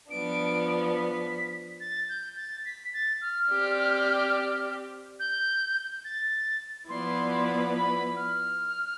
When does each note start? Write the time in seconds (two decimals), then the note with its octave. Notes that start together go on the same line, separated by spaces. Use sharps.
0.10 F3 B3 D4 D7
0.95 B6
1.80 A6
2.09 G6
2.37 A6
2.65 B6
2.94 A6
3.22 F6
3.50 C4 G4 D5
5.20 G6
6.05 A6
6.89 F3 B3 E4 B4 D5 C6
7.74 B5
8.16 F6